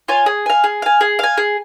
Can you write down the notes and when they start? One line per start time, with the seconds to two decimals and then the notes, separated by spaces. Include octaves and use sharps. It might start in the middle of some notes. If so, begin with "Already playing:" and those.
0.08 F4 C#5 G#5
0.26 G#4
0.46 F5 G#5
0.64 G#4
0.82 F5 G#5
1.01 G#4
1.19 F5 G#5
1.37 G#4